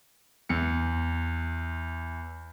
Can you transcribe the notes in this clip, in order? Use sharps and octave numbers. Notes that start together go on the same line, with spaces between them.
E2 C#7